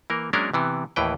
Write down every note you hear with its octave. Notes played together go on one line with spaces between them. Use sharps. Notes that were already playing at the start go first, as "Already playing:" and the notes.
E3 A#3 A#4
F#3 G#3 A#3 C#4 D4 A#4
C3 E3 B3
D#2 A2 E3 B4 G5